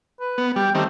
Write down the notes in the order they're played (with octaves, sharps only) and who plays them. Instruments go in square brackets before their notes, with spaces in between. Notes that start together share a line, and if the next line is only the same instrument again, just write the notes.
[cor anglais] B4
[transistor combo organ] B3
[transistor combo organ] G3 [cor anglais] G5
[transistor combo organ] D#3 G3 C4 [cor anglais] A3